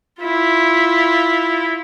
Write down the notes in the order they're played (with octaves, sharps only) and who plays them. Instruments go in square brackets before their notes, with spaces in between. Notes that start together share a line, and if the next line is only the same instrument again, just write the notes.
[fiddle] E4 F4